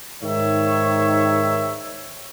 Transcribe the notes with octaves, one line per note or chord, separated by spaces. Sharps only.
G#2 D#3 C#5 E5